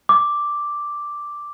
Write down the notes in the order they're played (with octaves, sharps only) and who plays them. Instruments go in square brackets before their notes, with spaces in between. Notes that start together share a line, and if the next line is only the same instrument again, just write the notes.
[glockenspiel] D6